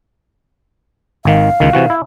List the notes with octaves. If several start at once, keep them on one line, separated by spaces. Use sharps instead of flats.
G#1 D#3 F5
C#2 D#3
C3 E3 F#4
E4